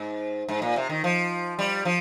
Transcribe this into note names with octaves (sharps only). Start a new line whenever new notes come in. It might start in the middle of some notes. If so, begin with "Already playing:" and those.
Already playing: G#2
G#2
A#2
C3
D#3
F3
G3
F3